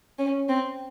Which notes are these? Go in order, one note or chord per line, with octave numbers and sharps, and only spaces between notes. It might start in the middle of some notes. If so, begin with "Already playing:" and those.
C#4
C4